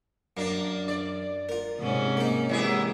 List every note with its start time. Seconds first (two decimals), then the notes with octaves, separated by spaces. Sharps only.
0.37 F#2 A#3 D4
0.88 D5
1.49 F4 A#4
1.79 G#2 C3 C#4
2.17 A#3 D#4
2.49 E3 F#3 G#3 E4 G4 G#4